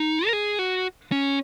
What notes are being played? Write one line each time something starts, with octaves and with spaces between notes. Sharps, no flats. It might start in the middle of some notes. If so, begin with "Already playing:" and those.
Already playing: D#4
A#4
G#4
F#4
C#4